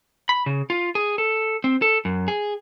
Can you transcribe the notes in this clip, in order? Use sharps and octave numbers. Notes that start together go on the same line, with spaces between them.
B5
C#3
F4
G#4
A4
C4
A4
F#2
G#4